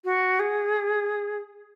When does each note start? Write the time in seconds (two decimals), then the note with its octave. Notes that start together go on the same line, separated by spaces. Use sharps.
0.05 F#4
0.40 G#4